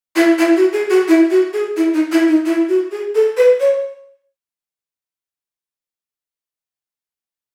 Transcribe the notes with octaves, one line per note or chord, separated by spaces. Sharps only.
E4
E4
F#4
G#4
F#4
E4
F#4
G#4
E4
D#4
E4
D#4
E4
F#4
G#4
A4
B4
C#5